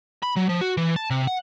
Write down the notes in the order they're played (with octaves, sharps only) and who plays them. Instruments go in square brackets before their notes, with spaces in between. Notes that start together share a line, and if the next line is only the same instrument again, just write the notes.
[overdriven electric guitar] B5
F#3
F3
F#4
E3
A5
C3
F#5